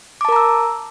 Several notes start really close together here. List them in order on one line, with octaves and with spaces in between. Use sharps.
D6 A5 A#4 A#5 E6